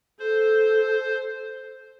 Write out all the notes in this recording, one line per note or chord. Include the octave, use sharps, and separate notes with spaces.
A4 C5